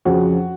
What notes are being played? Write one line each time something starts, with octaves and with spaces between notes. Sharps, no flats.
F2 C#3 F3 F#4